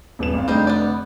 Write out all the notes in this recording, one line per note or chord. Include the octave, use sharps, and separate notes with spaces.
D#1 B3 E7
G#1 F5
F1 D3 G3 C4 D#4
B3 D5